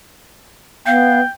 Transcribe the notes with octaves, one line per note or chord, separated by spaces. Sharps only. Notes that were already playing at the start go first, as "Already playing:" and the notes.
B3 F5 G5